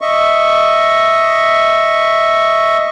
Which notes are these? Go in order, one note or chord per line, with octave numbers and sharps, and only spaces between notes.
D#5 E5 C#6